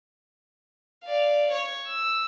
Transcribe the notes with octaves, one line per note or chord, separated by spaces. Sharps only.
D5 F5
C#5
E6